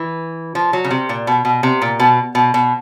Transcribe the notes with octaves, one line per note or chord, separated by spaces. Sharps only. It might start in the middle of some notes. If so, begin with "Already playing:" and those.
Already playing: E3
F3
F#3
C#3
C3
A#2
B2
B2
C3
A#2
B2
B2
B2